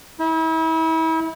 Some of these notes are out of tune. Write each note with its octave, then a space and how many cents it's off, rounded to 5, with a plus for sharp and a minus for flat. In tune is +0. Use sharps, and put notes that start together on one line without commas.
E4 -35